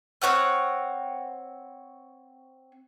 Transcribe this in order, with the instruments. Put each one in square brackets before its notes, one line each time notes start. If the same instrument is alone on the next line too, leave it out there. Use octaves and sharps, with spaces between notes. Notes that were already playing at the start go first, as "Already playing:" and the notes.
[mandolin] C4 C#5 F#5 F6